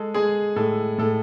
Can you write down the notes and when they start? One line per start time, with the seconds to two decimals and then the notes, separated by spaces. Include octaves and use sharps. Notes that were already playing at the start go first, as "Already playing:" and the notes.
Already playing: G#3 A4
0.14 G#3 G#4
0.56 A2 A4
0.98 A2 A4